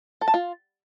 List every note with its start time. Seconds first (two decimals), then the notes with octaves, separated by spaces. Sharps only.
0.21 A4
0.28 A5
0.34 F4